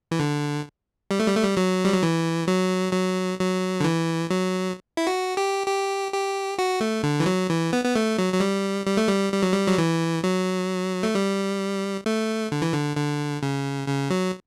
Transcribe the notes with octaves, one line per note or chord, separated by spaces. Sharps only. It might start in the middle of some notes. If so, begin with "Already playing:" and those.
E3
D3
G3
A3
G3
A3
G3
F#3
G3
F#3
E3
F#3
F#3
F#3
D3
E3
F#3
E4
F#4
G4
G4
G4
F#4
A3
D3
E3
F#3
E3
B3
B3
A3
F#3
F#3
G3
G3
A3
G3
G3
F#3
G3
F#3
E3
F#3
A3
G3
A3
D3
E3
D3
D3
C#3
C#3
F#3